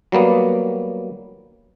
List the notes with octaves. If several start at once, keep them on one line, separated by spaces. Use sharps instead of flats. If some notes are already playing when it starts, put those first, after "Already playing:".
F#3 G3 A#3 B3